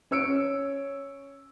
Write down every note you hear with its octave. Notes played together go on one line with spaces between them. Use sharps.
C#4 C#5 E6 C#7 D7